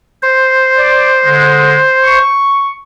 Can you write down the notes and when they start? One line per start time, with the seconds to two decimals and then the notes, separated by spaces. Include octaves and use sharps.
0.23 C5
0.77 D5
1.24 D3 G#3
2.03 C#6